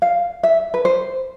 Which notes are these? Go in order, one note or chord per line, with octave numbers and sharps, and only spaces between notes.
F5
E5
B4
C5